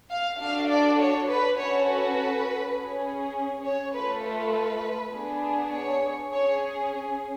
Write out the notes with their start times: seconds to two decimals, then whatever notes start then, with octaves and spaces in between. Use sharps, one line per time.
0.10 F5
0.39 D4 F#4 A4 F5
0.68 D5
0.99 C#5
1.28 B4
1.57 C#4 F#4 A4 C#5
1.87 B4
2.77 C#4 G#4
3.65 C#5
3.95 A3 F4 A4 B4
4.25 B4
5.14 B3 D4 G#4
5.72 C#5
6.32 C#4 G#4 C#5